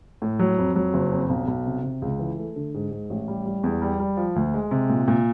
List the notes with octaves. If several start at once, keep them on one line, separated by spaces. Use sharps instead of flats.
A2
F#3
F2
F#3
F#1
F2
B1
B1
C3
C3
C#2
E3
A3
D3
G#2
G#2
A1
G3
G3
E2
G3
G3
F3
D2
G#3
C3
A#2
A#2